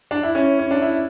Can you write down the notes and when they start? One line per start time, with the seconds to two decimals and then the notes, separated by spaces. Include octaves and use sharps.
0.11 D4
0.23 E4
0.35 C#4
0.59 C#4
0.71 D4
0.82 E4